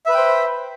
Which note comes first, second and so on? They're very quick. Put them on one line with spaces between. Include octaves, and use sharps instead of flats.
E5 B4 B5 G5 C5